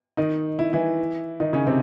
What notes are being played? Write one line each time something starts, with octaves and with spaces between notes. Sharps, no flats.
D#3 D#4
E4
E3 E4
D#3 D#4
C#3 C#4
C3 C4